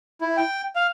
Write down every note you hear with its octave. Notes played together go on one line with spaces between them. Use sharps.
E4
G5
F5